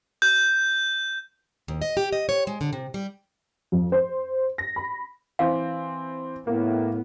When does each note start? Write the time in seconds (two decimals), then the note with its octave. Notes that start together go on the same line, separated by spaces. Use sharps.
0.22 G6
1.68 D#2
1.82 D#5
1.97 G4
2.13 D#5
2.29 C#5
2.47 G#3
2.61 D3
2.73 C3
2.94 G3
3.72 F2
3.92 C5
4.58 A#6
4.76 B5
5.39 E3 C4 F5
6.47 A2 A#3 B3